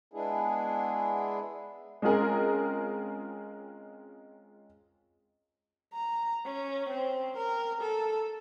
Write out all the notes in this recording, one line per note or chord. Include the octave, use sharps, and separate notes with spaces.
G#3 B3 D4 E4 G#4
G#3 C4 C#4 F4 G#4 A#4
A#5
C#4
C4
A#4
A4